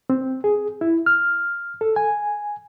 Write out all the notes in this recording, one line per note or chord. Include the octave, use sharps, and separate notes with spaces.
C4
G#4
E4
F6
A4
G#5